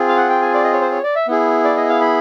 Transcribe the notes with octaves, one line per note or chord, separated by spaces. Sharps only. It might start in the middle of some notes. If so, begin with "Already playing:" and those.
Already playing: C4 F4 G#4
F5
F#5
G5
G#5
D5
D#5
C#5
C5
C#5
D5
E5
B3 E4 G#4
D5
D#5
F5
B5